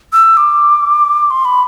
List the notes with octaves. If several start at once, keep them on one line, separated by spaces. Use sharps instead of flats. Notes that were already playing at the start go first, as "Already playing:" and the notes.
E6
D6
C6
B5